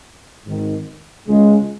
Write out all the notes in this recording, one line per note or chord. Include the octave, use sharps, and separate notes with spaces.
G#1 G#2 D#3
C#2 C#3 G#3